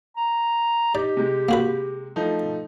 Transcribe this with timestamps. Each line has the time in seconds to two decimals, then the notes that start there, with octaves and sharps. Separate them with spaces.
0.17 A#5
0.95 D#4 G4 D5
1.17 C3 G#3
1.49 A#3 F#4 B4
2.16 F3 A3 D#4